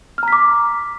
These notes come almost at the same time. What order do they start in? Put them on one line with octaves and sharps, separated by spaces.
F6 A#5 B6 D6